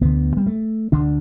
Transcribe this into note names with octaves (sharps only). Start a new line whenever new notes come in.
D2 D3 B3
G3
A3
D2 D3 D4